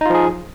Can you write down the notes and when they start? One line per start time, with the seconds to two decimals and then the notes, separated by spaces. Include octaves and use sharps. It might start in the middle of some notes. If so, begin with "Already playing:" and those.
0.01 D#4
0.06 F4
0.10 F3
0.15 G#4